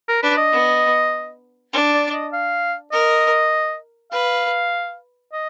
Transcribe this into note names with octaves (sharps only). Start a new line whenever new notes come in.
A#4
D4 B4
D#5
B3
D4
D5
D#5
F5
A#4 D#5
B4 F5
D#5